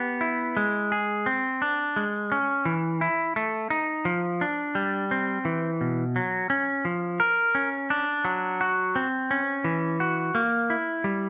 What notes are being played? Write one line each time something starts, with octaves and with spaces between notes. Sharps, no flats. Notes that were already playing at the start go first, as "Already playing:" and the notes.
Already playing: B3 G4
E4
G#3
G#4
C4
D4
G#3
C#4
E3
E4
A3
D#4
F3
D4
G3
C4
E3
B2
F#3
C#4
F3
A#4
C#4
D4
F#3
F#4
C4
C#4
E3
F#4
A#3
E4
G3